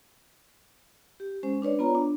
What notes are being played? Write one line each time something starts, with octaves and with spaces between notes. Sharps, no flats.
G4
G#3 C#4 C5
D4 B4 C#5 D5
B3 F4 A#5
D4